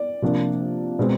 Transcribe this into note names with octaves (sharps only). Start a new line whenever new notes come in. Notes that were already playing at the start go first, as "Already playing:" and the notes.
Already playing: D5
C3 F3 A#3 D4
B2 G#3 C4